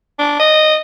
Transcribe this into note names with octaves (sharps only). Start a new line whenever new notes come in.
D4
D#5